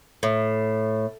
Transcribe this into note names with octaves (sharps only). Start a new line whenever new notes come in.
A2